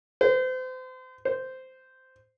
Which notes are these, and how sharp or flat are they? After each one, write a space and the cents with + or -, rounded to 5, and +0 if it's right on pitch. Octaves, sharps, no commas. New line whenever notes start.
C5 -35
C5 -10